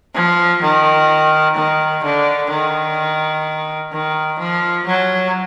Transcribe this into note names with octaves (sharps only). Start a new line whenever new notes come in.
F3
D#3
D#3
D3
D#3
D#3
F3
F#3